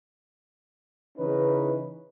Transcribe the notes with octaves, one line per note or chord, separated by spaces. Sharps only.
C#3 E3 C#4 D#4 B4